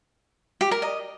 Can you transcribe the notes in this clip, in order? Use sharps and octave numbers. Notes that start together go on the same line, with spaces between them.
G4
A#4
D#5